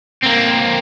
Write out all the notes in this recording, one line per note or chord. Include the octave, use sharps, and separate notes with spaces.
A#3 C4